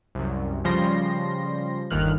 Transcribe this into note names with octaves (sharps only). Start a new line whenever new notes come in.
C2 F#2
C#3 F3 G3 C6 A#6
G1 D#2 D#3 F6 F#6